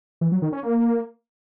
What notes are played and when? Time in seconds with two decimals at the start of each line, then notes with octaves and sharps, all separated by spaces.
0.21 E3
0.32 F#3
0.42 D#3
0.52 C#4
0.63 A#3